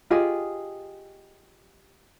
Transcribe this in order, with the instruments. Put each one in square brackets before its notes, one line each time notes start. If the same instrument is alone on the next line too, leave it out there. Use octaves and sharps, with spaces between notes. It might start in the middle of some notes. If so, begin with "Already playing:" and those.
[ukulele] F4 G4 G#4 D#5